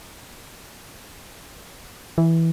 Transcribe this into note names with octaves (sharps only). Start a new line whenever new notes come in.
E3